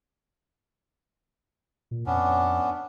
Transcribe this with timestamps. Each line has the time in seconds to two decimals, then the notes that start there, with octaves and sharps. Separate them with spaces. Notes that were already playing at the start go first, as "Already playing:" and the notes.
1.91 A#2
2.06 F2 B3 C#4 D4